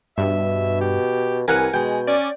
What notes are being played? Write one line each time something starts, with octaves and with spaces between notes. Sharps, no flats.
G2 B2 E5
G4
C2 A#4 B4 F#5 G#5
B2 G#3 G5
C#4 D5